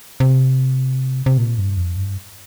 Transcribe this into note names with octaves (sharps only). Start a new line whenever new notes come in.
C3
C3
A#2
G2
F2
G2